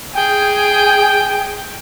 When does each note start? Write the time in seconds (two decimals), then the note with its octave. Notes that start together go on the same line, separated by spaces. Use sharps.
0.14 G#4 G5